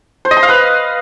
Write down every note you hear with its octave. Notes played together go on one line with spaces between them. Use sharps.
C5
D#5
C6
F5
B4